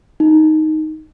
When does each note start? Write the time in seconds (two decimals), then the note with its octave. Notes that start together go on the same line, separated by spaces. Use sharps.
0.20 D#4